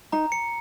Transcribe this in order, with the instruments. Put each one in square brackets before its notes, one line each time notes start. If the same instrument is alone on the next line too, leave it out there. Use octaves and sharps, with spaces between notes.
[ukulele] D#4 [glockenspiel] A#5
[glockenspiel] C#7